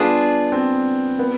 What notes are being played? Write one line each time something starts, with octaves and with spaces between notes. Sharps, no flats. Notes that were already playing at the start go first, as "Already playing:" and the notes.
Already playing: G3 B3 D4 F4 G#4
C4
B3